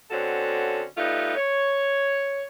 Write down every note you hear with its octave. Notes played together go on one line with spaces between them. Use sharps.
D3 C4 C#4 F#4 A4
G3 A3 B3 D#4 F4
C#5